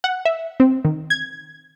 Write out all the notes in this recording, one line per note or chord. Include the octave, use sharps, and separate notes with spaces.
F#5
E5
C4
D#3
G#6